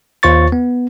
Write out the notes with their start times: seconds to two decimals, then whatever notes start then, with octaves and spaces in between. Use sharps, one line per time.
0.23 D#2 F4 C5 C#6 A6
0.52 B3